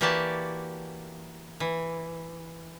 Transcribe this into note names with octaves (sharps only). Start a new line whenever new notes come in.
E3 A#3 F#4 G4 D5 A5
E3